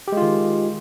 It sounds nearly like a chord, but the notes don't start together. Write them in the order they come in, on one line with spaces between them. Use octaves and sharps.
G4 G#3 F4 D#3